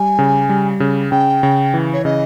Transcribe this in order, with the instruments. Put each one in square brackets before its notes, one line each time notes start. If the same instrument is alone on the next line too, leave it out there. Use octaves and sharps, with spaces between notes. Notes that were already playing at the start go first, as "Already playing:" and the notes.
Already playing: [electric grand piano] G3 [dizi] G#5
[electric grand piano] C#3
G3
C#3
[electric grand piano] C#3 [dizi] G5
[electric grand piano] C#3
E3
[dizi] C#5
[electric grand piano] C#3 [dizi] D#5